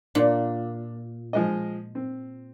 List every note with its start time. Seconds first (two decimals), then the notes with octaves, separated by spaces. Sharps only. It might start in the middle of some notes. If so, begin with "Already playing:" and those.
0.15 A#2 D4
1.33 F3 G#3 D#5
1.95 C4